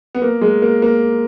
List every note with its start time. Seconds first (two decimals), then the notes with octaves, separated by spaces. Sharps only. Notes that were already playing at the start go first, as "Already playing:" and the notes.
0.15 B3
0.22 A#3
0.41 G#3
0.62 A#3
0.82 A#3